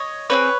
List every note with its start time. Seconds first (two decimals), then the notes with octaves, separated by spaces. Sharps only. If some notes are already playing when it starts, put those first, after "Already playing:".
Already playing: C#5 D#5
0.30 C4 D#4 G#4 B4 C#5